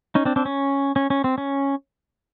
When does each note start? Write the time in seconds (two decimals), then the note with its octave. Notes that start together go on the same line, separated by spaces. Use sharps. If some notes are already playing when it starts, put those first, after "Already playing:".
0.15 C#4 D#4
0.25 C4 D4
0.36 C4 D4
0.45 C#4
0.96 C#4
1.10 C#4
1.24 C4
1.38 C#4